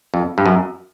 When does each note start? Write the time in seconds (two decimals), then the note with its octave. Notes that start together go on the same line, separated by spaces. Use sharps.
0.14 F2
0.38 G2
0.46 F#2